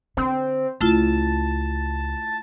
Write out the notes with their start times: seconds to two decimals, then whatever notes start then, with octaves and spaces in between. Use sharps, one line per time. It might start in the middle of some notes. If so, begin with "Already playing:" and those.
0.17 D3 C4
0.81 C#2 A3 E4 F4 A5